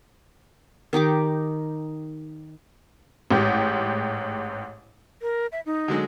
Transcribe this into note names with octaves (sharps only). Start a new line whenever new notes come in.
D#3 D#4 G4 D6
A1 G#2 G4
A#4
E5
D#4
D3 F#3 G#3